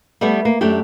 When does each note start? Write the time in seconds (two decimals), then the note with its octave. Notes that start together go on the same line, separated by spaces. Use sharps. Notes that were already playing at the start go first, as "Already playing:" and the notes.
0.21 G3 A3 B3
0.45 A#3
0.61 F#2 A3 D4 G4